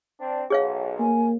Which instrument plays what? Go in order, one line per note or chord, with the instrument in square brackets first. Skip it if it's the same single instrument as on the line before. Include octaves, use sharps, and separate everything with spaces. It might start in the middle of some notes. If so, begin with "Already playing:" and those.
[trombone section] C4 D4
[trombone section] B1 [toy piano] G#4 C#5 F5
[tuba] A#3 [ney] G#5